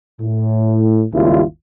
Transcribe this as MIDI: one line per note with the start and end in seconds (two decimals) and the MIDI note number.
0.21 1.05 45
1.13 1.42 32
1.13 1.42 39
1.13 1.42 49
1.13 1.42 55
1.13 1.42 64
1.13 1.42 65